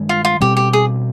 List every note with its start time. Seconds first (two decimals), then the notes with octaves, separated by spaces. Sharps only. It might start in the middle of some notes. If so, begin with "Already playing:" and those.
Already playing: G2 D#3 G#3
0.09 F4
0.25 F4
0.40 B2 G3 C4 G4
0.57 G4
0.73 G#4